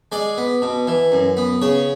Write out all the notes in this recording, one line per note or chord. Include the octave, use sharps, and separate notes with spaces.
G#3 D5
B3
B2
E3
F#2
B3
C#3 C#5